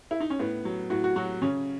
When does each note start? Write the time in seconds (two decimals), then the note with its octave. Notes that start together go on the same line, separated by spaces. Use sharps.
0.11 E4
0.20 D#4
0.30 C#4
0.39 A2 B3
0.65 F#3
0.90 A2 F#4
1.04 F#4
1.16 F#3 F#4
1.42 C#3 C#4